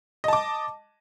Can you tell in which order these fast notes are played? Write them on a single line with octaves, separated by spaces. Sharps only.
D#5 A5 D6